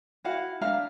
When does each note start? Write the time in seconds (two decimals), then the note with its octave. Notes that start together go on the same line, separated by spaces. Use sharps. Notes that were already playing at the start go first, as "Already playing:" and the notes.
0.24 E4 F#4 F5 F#5
0.61 D4 E5 F5 A#5